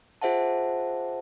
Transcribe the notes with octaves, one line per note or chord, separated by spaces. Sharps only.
F4 G#4 C5 E5 F#5 A5